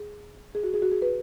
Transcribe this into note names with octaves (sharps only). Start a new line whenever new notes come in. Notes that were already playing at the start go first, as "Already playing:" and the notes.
Already playing: G#4
G#4
F#4
G#4
F#4
G#4
B4